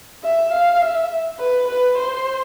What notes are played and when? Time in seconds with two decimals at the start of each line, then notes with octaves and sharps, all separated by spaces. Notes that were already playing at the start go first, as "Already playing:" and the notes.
0.24 E5
0.53 F5
0.81 E5
1.39 B4
1.68 B4
1.98 C5